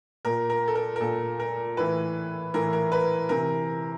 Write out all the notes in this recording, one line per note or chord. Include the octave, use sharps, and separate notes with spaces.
A#2 A#4
A#4
A4
A#4
A#4
A#2 A4
A#4
A2 E3 B4
A2 E3 A#4
A#4
B4
C3 E3 A#4